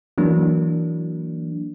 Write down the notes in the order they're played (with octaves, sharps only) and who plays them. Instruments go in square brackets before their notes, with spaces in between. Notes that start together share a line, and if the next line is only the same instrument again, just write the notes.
[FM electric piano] E3 F#3 A#3 D4